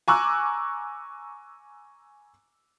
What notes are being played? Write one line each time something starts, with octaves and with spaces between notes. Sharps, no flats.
G#5 A#5 C#6 D6 E6 F#6